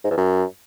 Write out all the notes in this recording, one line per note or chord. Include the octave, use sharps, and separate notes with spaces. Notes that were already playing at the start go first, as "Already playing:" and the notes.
G#2
E2
F#2